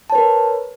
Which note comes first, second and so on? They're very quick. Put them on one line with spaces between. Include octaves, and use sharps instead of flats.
A5 C#5 B4 A#4